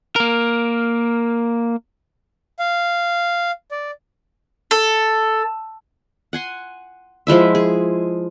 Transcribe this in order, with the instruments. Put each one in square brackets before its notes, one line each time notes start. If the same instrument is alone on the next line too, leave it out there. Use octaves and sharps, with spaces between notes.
[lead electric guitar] A#3 A#4
[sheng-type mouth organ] F5
D5
[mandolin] A4
[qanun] F#5 G#5 C6
F3 G#3 E4 E5
G#4